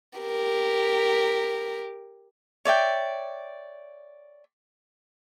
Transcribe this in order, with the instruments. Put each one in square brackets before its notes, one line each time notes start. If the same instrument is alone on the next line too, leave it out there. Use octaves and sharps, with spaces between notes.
[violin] G4 A#4
[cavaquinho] C#5 D5 E5 G5